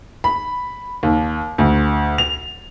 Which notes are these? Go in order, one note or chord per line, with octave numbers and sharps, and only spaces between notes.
B5
D#2
D2
F7